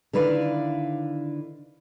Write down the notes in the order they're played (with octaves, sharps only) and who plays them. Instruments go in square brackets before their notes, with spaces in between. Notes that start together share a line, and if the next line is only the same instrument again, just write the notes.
[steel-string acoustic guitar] D3 D#3 E4 B4 D5 F5